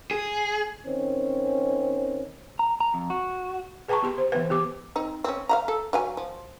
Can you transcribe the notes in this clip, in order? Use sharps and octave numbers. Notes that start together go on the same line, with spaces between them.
G#4
D#3 C4 C#4
A#5
A#5
F2
F#4
G#4 B4 G5 A5 A#5 C#6
B3 G4 C6
C5
E3 B3 B4
B3 G4 D6
C4 D#4
C4 C#4
F5 F#5 A#5
A4
F#3 F5 G#5
F3